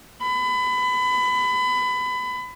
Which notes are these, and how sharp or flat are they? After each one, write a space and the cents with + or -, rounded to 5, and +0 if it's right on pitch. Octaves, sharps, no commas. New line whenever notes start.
B5 +25